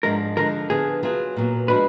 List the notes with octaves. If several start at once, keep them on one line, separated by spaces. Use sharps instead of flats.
G#2 F3 G#3 D4 A#4
D3 F3 G#3 A#4
D3 F3 B3 G#4
F#3 B3 F4 G#4
A#2 F#3 B3
F3 G#3 D4 F#4 B4